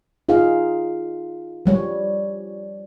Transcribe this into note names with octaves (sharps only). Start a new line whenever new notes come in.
D#4 F4 G#4 F5
F3 G3 C#5